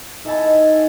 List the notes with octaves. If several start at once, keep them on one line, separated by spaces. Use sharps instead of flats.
D#4 A4 E5 G#5 A5 B5